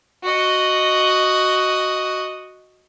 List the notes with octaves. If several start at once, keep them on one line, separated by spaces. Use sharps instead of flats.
F#4 D#5